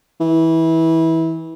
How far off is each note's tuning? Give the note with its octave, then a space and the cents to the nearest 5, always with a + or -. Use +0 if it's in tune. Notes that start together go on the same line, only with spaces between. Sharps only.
E3 -20